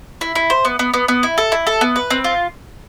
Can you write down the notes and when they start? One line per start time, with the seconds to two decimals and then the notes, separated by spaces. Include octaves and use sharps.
0.21 E4
0.35 E4
0.50 C5
0.65 B3
0.79 B3
0.94 B3
1.08 B3
1.23 E4
1.38 A4
1.52 E4
1.67 A4
1.81 B3
1.96 B4
2.10 C4
2.24 F4